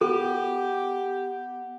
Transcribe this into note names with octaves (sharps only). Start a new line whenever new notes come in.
B3 G4 A4 F#5